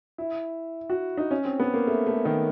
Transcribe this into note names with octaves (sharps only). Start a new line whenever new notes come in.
E4
F#4
D#4
C#4
C4
B3
A#3
A3
A3
D#3